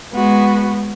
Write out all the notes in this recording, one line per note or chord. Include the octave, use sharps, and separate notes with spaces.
G#3 B3 F#4